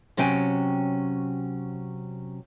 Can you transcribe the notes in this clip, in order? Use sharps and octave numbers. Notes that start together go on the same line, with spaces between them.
C3 F#3 C#4 G5 G#5